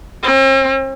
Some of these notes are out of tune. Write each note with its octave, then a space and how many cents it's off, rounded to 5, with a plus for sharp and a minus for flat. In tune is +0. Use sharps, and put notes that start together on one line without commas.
C4 +45